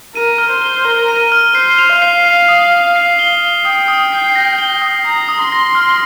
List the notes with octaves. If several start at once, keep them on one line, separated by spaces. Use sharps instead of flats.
A#4 D#7
F6
C5
G7
A#4 G7
D#7
F6
C5 C7
F7
F5
C7
C7
D#6
C7
C7
G7
G7
G5 D#6
D#6
C7
A#6
G7
D#6
A#5 D#6
D#6
C6
A#6
F6